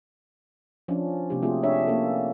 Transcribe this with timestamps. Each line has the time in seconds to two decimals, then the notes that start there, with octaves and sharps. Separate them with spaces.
0.88 F3 C#4 D4
1.30 C3 A#3 C4 D4 G4
1.42 A3 C4 F4 F#4 G#4
1.63 D4 C#5 E5
1.87 A#3 C#4 A4